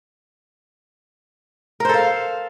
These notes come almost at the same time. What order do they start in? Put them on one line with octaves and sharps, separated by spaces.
A#4 C5 A4 F5